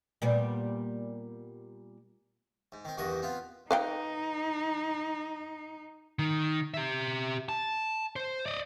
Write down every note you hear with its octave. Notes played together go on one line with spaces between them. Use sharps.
A#2 G3 B3
G#2
D#3 C4
E2 G2 D#3 F#4 D#5
B3 C4 F4
D#4 B4 F5 G5
D#3
G4 E5
A5
C5
D5 D#5